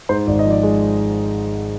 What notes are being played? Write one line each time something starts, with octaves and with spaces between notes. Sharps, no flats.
G#2 C5
G#1 D5
D#5
F3 D5
G#3